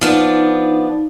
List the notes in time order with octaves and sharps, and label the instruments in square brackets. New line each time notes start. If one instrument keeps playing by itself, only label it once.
[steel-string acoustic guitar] F3 B3 D4 [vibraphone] D#4